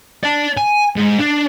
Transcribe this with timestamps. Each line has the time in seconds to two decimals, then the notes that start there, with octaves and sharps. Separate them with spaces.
0.23 D5 A5
0.57 G#5
0.97 G#2
1.19 D4